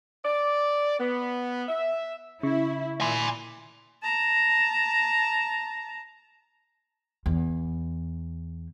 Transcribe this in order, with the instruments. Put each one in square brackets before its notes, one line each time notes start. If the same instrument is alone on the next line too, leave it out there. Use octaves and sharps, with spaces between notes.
[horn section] D5
B3
E5
[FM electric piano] C#3 C#6 [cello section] E4
[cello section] A#2 [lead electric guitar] G#5 B5 [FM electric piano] C6 D6
[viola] A5 A#5
[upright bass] E2